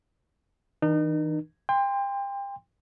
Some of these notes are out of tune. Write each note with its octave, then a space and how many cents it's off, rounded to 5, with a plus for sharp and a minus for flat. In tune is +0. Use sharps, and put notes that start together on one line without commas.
E3 -45 D#4 -35 A#4 +35
G5 +30 C6 -10